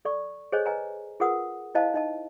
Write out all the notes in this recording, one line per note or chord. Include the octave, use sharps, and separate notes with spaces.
A4 D5 C#6
G#4 A4 C5 C#5 D#5 G#5
B4 D#5 G#5 A#5
F4 G#4 A#4 B4 F#5 D#6
E4 C5 D#5 F5 A5
D#4 D#5 A5